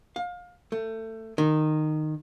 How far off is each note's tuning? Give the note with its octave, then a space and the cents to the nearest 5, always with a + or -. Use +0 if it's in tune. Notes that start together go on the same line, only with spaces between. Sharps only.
F5 +25
A3 +20
D#3 -15